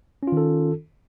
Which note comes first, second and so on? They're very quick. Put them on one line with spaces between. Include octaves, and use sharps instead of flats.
C#4 F4 D#3 A4